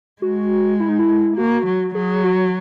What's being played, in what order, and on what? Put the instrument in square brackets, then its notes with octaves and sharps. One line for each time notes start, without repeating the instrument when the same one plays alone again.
[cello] G#3 [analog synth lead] F#4
[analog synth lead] E4
D#4
E4
[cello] A#3 [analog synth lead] F#4
[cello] F#3
[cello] F#3 [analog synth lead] G#4
[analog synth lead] F#4